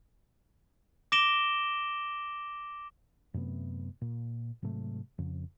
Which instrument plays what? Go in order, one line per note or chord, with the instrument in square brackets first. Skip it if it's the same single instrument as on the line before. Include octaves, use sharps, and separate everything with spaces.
[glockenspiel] D6 A#6 D7 E7 G7
[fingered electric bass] F#2 C3 A3 B3
A#2
G#2 C3 F#3 A3
F2 C#3